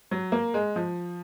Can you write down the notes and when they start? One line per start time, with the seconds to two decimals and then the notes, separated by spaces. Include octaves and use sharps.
0.11 F#3
0.32 A#3
0.54 G#3
0.76 F3